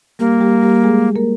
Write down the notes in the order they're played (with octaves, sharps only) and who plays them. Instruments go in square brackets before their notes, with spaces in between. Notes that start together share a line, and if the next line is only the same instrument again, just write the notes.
[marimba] G3 G4 [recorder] A#3
[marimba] G3 G4
G3 G4
G#3 G#4
A#3 A#4